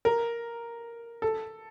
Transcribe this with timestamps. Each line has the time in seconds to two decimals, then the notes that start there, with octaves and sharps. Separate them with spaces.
0.05 A#4
1.22 A4